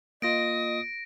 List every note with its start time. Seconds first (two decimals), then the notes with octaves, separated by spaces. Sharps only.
0.22 A#3 F4 D#5 D#6 A#6 D7